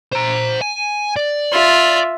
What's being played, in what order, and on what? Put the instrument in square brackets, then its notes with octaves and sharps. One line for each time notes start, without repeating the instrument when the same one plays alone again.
[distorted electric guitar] C5 A#5
G#5
D5
[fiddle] F4 E5